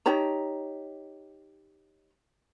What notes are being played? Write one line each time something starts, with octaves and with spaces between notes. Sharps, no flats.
D#4 G4 C#5 A#5